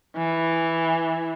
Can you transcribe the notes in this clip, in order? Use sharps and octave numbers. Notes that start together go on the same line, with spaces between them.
E3